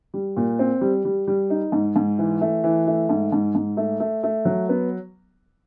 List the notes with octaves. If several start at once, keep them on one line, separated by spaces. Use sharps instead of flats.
G3
A#2
C4
G3
G3
G3
D#4
G#2
G#2
E3
A3
E3
A3
G#2
G#2
G#2
A3
A3
A3
F#3
B3